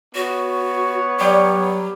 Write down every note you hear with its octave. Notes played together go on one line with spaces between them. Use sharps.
B3 F#4 C#5
F#3 G3